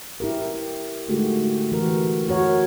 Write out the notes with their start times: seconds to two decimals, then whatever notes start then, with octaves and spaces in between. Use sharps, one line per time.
0.20 E4 G4 A#4
1.08 D3 G#3 A3 D#4 F#4 G4
1.72 E3 F#4 G4 A#4
2.28 F#4 A#4 C#5 F#5